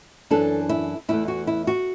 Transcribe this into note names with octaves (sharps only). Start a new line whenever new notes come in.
F#2 E3 D4 A4
E4
E2 E3 A3 E4
F#4
E4
F#4